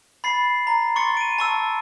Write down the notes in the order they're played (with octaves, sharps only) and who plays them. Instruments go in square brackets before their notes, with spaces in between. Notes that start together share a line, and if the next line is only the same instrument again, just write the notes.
[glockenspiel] B5 A6 C7
A#5
C6 C#6 A6 C#7
D7 D#7
A5 C#6 E6